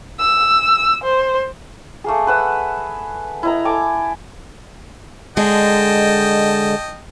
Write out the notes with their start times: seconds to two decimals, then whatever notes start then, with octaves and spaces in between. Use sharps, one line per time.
0.20 E6
1.04 C5
2.04 A3 A#3 G#4
2.27 B4 F#5 E6
3.43 E4 D#5 A#5
3.65 A4 G#5 D6
5.37 D3 G#3 D#5 G5 A5